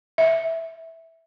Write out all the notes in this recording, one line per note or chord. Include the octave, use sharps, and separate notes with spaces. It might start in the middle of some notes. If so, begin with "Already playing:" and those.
E5